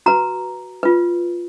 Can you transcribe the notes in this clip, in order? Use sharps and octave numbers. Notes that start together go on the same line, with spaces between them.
F#4 B4 A#5
F4 B4